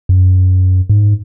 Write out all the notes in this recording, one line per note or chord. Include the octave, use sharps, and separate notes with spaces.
F#2
G#2